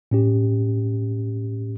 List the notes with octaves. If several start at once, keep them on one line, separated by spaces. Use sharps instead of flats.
A2 C#4 G4